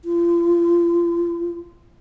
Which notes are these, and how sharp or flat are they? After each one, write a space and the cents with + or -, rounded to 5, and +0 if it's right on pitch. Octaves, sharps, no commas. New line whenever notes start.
F4 -35